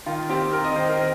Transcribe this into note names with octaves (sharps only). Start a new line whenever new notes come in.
D#3 F4
C4 G4
C4 A#4
D#5
D#3 C5
A#4
C4 C5